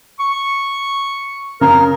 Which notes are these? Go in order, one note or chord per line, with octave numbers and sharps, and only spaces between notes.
C#6
C#3 A#4 A#5